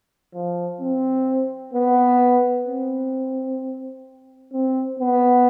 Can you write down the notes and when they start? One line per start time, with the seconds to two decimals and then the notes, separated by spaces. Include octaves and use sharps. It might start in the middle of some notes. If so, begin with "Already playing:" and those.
0.34 F3
0.81 C4
1.74 B3
2.67 C4
4.53 C4
4.99 B3